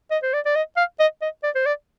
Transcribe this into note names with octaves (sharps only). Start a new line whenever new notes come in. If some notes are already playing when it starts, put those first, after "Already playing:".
D#5
C5
D5
D5
D#5
F5
D#5
D#5
D5
C5
D5